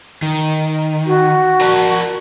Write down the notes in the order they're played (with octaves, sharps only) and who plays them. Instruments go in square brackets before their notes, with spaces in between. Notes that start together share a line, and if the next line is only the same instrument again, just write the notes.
[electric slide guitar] D#3
[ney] F#4
[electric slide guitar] A#4 D5 A5